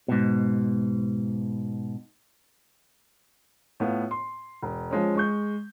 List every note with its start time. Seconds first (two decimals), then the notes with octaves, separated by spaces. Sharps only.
0.08 G#2 B2
3.80 A2 B3 F4
4.11 C6
4.63 E1
4.91 F3 G#3 C#4
5.16 G#3 C#6 G6